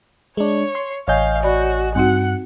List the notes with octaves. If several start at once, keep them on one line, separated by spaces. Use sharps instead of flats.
G#3 D4 C#5
C6
A1 C#5 D#5 F5 G#5 G6
F#4 D5 B5
G2 C4 D#4 F#4 F#5